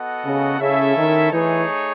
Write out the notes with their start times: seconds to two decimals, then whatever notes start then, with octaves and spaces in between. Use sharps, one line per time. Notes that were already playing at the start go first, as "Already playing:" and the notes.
Already playing: B3 F#4 A4 D#5 F#5
0.25 C#3
0.60 C#3 C#4 E4 A4 E5
0.97 D#3
1.32 E3 A3 D#4 G#4 C#5